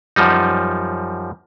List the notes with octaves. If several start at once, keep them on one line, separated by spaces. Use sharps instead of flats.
F#2 F3 G3 D#4